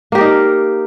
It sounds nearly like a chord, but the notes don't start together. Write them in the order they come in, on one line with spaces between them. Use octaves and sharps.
A#3 G4 A#4 D#4